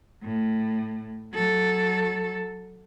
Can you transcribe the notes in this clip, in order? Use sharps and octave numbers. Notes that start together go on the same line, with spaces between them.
A2
F#3 A4